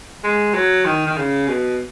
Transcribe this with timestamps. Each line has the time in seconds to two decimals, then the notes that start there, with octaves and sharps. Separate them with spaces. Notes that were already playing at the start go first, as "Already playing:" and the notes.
0.24 G#3
0.54 F#3
0.85 D#3
1.07 D#3
1.17 C#3
1.48 B2